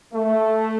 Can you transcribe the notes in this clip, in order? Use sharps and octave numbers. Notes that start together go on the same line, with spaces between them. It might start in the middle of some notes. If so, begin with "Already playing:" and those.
A3